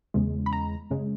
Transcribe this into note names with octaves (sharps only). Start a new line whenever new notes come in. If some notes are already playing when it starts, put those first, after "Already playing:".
E2 C#3 G#3
B5
A#5
F#2 C#3 G#3